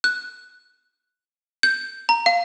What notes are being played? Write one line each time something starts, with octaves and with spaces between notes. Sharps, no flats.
F#6
G6
A#5
F5